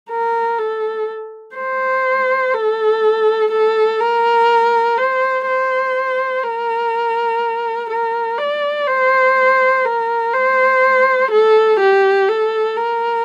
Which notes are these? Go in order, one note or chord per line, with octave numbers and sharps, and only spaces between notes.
A#4
A4
C5
A4
A4
A#4
C5
C5
A#4
A#4
D5
C5
A#4
C5
A4
G4
A4
A#4